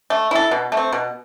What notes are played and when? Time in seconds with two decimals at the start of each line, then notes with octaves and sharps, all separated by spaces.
0.10 A3
0.31 E4 A4
0.51 B2
0.72 A3
0.77 C4
0.93 B2